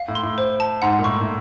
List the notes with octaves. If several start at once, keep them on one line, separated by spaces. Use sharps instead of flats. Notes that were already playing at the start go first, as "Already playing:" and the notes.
Already playing: F5
A2
C6
A2
C5
A5
G#2 F#5
A#2
A2 C#6
A2